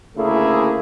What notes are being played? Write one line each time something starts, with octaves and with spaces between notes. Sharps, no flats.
D2 C#3 A3 A#3 E4 G#4